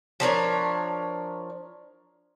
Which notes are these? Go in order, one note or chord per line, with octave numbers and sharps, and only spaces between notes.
F3 D4 A#4 C#5